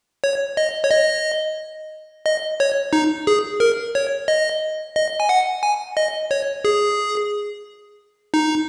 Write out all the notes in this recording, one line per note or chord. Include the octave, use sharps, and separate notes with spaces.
C#5
D#5
C#5
D#5
D#5
C#5
D#4
G#4
A#4
C#5
D#5
D#5
G#5
F#5
G#5
D#5
C#5
G#4
D#4